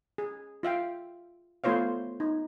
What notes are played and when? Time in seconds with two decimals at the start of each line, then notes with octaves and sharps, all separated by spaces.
0.18 G#4
0.63 F4 E5 F5 G5
1.64 A3 B3 F4 C5 C#5 F5
2.20 D#4